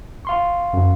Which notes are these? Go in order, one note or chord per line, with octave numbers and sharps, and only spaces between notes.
F5 C6 C#6
F#2